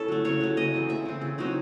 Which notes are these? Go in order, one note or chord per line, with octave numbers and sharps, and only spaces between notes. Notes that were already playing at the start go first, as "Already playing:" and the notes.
Already playing: C#4 E4 A4
F#3 A3
C#3 C#5
F#3 A3
C#3 D#5
E3 C4
C#3 E5
E3 C4
C#3
F#3 C4 D#4